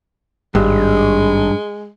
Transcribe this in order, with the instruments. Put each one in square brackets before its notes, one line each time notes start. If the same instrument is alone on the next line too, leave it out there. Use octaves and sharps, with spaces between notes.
[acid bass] G#1 [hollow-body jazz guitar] G2 [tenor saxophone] G#3